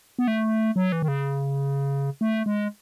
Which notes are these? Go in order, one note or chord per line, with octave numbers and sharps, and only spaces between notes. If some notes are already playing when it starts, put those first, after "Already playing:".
B3
A3
F#3
E3
D#3
C#3
A3
G#3